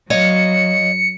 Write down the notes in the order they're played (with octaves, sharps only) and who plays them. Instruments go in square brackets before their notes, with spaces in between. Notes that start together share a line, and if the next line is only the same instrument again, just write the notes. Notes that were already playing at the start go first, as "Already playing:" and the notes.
[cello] F#3 [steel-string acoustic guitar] C#5 D#5 F5 [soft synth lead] C#7